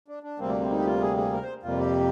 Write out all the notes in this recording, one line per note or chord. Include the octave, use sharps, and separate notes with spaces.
D4
D4
D2 C3 G3 A#3 C4
D4
C4
D#4
G4
F4
G#4
G#4
A#4
C5
F2 C3 G3 A#3 F4
G4